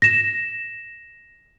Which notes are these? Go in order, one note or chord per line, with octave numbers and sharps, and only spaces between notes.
A#6 E7